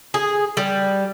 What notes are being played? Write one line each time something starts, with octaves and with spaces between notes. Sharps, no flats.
G#4
G3